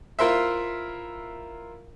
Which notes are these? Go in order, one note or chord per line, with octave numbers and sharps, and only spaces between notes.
E4 F4 A#4 C5 E5